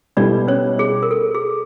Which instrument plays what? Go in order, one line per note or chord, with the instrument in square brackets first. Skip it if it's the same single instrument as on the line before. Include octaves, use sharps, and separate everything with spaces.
[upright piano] B2 G3 B3 E4 A4 [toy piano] D4 D5
[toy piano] C#4 C#5
G#4
A#4
A4
G#4